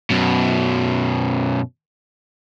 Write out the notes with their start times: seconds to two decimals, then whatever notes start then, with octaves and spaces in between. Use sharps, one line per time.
0.10 F#2 B2